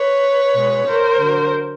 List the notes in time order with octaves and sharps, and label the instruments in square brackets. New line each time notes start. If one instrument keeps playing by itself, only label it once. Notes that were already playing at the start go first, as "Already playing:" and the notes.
Already playing: [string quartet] B4 C#5
B2 G#3
A#4 C5
D3 F#3